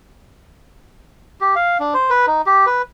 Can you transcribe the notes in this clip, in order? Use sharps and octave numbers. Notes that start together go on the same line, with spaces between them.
G4
F5
D4
C5
B4
D#4
G4
B4